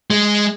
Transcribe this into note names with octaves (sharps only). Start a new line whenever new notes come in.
G#3